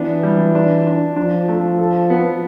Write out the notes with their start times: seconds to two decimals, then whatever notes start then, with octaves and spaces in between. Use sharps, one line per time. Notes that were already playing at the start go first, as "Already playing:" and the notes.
Already playing: E3 B3 D4
0.23 G3
0.55 D4
0.86 D4
1.16 F3 D4
1.48 A3
1.78 A4
2.10 B3